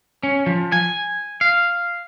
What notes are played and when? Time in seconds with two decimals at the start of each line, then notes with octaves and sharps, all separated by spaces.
0.23 C#4
0.46 F3
0.72 G#5
1.41 F5